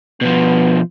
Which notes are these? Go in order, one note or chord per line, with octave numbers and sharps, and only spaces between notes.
B2 F3 B3